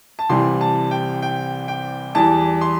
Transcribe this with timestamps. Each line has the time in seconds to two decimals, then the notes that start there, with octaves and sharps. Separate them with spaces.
0.19 A5
0.29 C2 C3 E3 G3 C6
0.61 A5
0.91 G5
1.22 G5
1.68 G5
2.15 E2 E3 G3 A5
2.61 C6